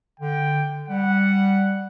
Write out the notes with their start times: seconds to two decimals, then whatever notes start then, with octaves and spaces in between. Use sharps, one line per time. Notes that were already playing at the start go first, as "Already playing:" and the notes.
0.20 D3 G5
0.89 G3 F#5